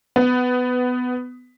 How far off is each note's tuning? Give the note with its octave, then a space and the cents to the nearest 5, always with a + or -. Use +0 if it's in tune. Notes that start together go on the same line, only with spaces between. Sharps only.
B3 +15